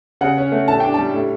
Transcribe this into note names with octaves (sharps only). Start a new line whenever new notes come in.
C#3 F#5
C#4
A3
A2 A5
D4 G5
G3 A5
A2